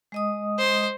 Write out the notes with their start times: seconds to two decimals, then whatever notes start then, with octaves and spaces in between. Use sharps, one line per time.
0.12 G#3 D#5 D#6
0.58 C5